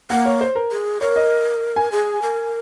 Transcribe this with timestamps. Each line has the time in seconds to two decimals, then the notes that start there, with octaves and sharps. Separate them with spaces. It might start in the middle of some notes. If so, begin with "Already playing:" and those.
0.10 A#3 F#5
0.25 C#5
0.41 C5
0.55 A#4
0.71 G#4
1.01 A#4 C#5
1.16 D#5
1.76 G#5
1.92 G#4
2.22 A#4